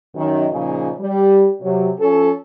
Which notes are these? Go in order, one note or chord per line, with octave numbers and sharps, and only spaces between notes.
F#2 D#3
A#2 C#3 F3 D#4 G#4
G3
C3 F#3
F3 C#4 A4